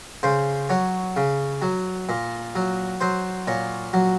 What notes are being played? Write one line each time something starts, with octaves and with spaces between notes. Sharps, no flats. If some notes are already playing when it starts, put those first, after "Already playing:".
C#3 C5
F#3 C#5
C#3
F#3
A#2
F#3
F#3 C5
A#2 C#5
F#3